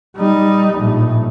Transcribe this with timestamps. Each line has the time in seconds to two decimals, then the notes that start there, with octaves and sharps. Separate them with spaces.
0.17 G3 D#4
0.74 A#1 A2